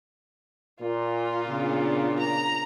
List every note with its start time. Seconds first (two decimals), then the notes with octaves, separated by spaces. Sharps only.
0.81 A#2 F4
1.48 C#3 B3 D4
2.19 A#5